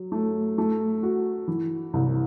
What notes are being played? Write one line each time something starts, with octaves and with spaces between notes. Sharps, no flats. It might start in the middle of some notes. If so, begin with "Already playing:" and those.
Already playing: F#3
A3
A3
F#4
E3
C2